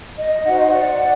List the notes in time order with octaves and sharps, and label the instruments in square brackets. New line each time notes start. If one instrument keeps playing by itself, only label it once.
[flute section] D#5
D#4 F#4 C5 F#5
D#5
D5 F#5